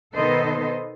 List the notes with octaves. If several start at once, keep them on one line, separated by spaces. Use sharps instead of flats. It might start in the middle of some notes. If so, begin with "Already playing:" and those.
B2 D#3 B3 A4 C5 D#5